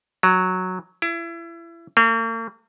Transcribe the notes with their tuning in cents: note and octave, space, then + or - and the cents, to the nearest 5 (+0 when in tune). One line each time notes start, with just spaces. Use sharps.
F#3 -5
E4 +30
A#3 -45